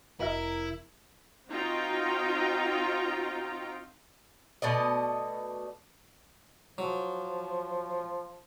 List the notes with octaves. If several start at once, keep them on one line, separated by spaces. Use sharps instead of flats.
F1 E4 F#4 A#4 D#5 E5
C4 D#4 F4 F#4 G5 A#5
B2 A3 D5 D#5
F3 F#3